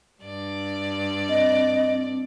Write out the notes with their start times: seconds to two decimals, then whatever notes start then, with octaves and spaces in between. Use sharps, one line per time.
0.21 G2 D5
1.29 C4 D#5